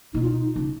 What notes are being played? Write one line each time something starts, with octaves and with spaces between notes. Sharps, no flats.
B2 D#4
F4
D#4
C#3